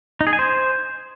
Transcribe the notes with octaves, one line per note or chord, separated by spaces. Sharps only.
D#4
G#4
G#5
C5